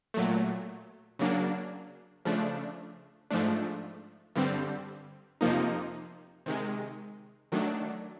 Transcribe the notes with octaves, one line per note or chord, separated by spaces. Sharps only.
A#2 F#3 A3
C#3 F#3 A#3 D4
C#3 F3 A3 D4
G#2 F3 A3 D4
G2 D3 G3 C4
F2 C3 F3 A#3 D#4
C3 D#3 G#3
D#3 F#3 A3 D4